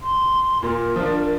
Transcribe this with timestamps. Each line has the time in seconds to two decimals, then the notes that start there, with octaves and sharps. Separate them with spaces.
0.02 C6
0.63 A#2 A#4
0.96 F3 D4